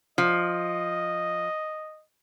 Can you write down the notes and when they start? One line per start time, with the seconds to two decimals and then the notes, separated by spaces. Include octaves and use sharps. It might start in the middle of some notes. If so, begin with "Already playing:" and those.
0.18 F3 D#5